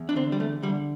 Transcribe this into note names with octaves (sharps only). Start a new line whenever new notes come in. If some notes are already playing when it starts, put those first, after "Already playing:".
Already playing: E2
D4
D3 C4
G3
E2 A3
D3 G3